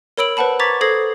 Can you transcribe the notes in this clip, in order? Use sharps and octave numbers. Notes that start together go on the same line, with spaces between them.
A#4 C#5 B5 E6 D7 F#7
B4 C5 F#5 A5 B5
A#5 C#6 D6 G#6 A6 B6
A4 C5 D#6 G#6 A#6 C7